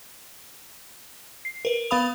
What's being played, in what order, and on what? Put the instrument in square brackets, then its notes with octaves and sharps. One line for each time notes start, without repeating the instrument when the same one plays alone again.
[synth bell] C7
A#4 B4
B3 B4 F5 B5 D#6 F7